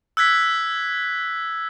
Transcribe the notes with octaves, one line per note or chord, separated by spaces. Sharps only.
E6 F#6 G#6 B6